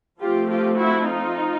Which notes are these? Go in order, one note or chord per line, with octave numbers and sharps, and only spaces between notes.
F3 A3 C4 F4 G4
F4 G4
E4 F#4
D#4 F4